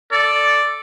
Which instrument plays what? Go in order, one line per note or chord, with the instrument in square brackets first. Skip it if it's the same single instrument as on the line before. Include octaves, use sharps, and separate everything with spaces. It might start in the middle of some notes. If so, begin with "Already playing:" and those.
[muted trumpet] A4 [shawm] D5